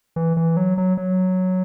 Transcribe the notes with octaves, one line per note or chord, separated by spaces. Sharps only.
E3
E3
F#3
F#3
F#3